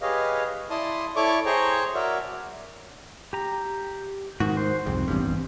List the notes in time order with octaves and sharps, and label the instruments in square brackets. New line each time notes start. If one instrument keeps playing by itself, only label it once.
[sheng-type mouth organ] G4 G#4 B4 C#5 D#5 F5
E4 D5 A5 C6 D#6
E4 A4 C#5 D5 C#6 D6
G#4 C5 C#5 G5 A#5 C#6
F#4 A#4 C#5 D5 E5
[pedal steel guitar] G4 A#5
[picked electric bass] G#2 D#3 [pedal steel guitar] F#4
[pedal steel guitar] C5
[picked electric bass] C2 F2 G#2 [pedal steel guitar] C4
[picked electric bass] A1 E2 G2